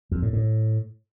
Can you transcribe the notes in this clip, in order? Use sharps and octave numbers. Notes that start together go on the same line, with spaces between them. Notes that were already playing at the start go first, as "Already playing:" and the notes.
F2
A2
A2